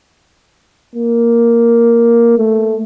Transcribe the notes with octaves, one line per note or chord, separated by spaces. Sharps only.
A#3
A3